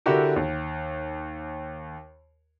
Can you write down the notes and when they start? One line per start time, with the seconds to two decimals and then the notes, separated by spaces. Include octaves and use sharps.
0.06 D3 E4 F#4 G4 A#4
0.36 D#2